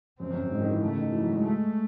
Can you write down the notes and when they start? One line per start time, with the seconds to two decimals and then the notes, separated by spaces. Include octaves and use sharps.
0.20 F#2 C4
0.30 F#2
0.41 F#2
0.51 G#2
0.61 D#3
0.71 E3
0.81 C#3 A3
0.97 D#3
1.12 E3
1.22 F#3
1.33 G#3
1.42 A3